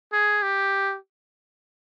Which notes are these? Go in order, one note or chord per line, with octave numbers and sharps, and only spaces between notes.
G#4
G4